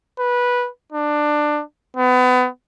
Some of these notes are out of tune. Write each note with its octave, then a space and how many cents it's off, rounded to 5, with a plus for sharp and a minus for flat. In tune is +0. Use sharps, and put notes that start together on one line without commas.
B4 -15
D4 +15
B3 +30